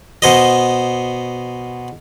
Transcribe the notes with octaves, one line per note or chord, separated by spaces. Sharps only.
B2 C5 D#5